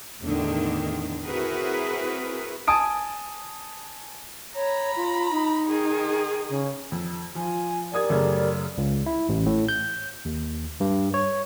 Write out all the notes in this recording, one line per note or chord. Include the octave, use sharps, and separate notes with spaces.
E2 A2 D3 D#3
C4 E4 F#4 G#4 A#4 B4
G#5 A5 D#6 D7
C#5 A#5 B5
F4
D#4
D#3 G#4
C#3
F2
F3 F4 G#5
G4 A#4 D5 G#5 D#6 G#6
F#2 C#3 A3
C#2
E4
A1
A2
G6
D#2
G2
C#5